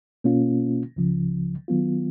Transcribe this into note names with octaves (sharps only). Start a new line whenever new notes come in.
B2 A#3 C#4 F4
C#2 C#3 F3
D#3 F#3 B3 F4